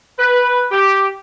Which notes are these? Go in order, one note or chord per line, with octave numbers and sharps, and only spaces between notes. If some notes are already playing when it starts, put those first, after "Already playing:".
B4
G4